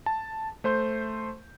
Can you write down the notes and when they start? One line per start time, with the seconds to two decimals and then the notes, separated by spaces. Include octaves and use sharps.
0.06 A5
0.64 A3 C5 C6 G6